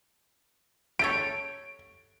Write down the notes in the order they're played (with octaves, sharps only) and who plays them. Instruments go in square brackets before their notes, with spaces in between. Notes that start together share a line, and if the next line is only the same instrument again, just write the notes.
[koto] G4 A4 C#5 [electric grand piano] D7